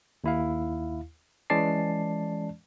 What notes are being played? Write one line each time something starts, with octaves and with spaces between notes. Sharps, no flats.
D#2 E4 F5
E3 G#3 C#4 D5 A5 C7